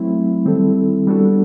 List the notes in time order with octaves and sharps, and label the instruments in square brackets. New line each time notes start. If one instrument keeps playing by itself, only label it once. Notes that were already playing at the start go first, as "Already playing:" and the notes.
Already playing: [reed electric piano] F#3 A3 C4 E4
D#3 G3 C4 E4 A4
G3 B3 D4 F#4 A4